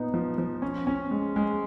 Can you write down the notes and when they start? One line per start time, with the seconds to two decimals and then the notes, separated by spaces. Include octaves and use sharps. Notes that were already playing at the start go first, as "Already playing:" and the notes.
Already playing: A#2 B3 D#4
0.14 F3
0.38 F3
0.62 C#4
0.87 C#4
1.11 G#3
1.36 G#3